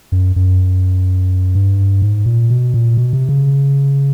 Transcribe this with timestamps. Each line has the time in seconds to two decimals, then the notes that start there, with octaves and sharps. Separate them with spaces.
0.12 F#2
0.36 F#2
1.55 G2
2.02 G#2
2.26 A#2
2.50 B2
2.74 A#2
2.97 B2
3.13 C3
3.29 C#3